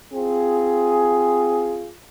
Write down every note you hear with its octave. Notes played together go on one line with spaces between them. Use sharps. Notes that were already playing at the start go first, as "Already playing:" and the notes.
C4 F4 G#4